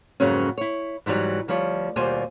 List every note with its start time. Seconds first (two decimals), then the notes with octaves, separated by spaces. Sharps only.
0.20 F2 G#2 C#3 F#3 A#3 C#4
0.58 E4 C#5
1.06 G#2 E3 F#3 G3 D#4
1.48 D2 F3 G3 C#5
1.96 D#2 B2 G3 F4 C5 G#5